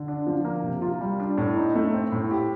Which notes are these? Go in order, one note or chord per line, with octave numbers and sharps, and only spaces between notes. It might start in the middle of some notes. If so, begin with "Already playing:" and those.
Already playing: D3
D4
F3
A#3
C3
F4
G3
D4
A2
D#4
A3
C4
A2
G4